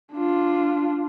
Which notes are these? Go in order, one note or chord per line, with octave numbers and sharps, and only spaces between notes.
D4 F4